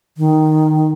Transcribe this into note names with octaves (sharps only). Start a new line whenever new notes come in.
D#3